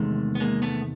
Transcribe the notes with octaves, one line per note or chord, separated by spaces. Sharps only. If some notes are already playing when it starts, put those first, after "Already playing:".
Already playing: E2 C3 D#3 G#3 A3
B3
G#3 A#3
A3 B3